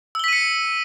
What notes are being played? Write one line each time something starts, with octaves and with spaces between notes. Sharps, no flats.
E6 B6 C#7 D#7 G7